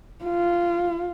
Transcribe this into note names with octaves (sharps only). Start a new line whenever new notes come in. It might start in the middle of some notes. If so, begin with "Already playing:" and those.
F4